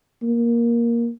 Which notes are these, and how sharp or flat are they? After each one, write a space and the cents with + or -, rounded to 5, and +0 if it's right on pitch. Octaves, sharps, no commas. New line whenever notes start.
A#3 +10